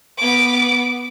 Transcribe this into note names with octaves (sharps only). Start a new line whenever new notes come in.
B3 D6